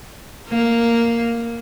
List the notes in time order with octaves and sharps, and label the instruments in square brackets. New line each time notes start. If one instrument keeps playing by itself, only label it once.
[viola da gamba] A#3